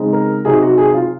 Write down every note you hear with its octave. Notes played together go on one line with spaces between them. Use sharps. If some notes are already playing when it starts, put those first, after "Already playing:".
Already playing: C#3 G#3 C4 D#4
A#4
C3 F#3 C4 D#4 G#4
F#4
G#4
F4